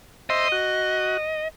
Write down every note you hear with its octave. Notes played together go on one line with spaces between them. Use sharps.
C5 D#5 E5 C6
F#4